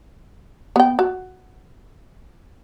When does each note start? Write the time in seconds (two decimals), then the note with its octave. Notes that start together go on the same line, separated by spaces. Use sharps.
0.76 B3 G5
0.99 F#4